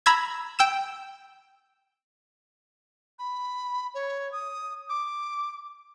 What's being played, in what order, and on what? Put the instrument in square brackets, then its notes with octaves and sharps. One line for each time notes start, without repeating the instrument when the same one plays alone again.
[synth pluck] A#5 B5 E6 G#6
G5 E6 E7
[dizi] B5
C#5
D#6
D6